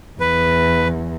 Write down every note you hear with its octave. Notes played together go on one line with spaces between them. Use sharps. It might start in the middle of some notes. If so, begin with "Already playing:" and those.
E2 B4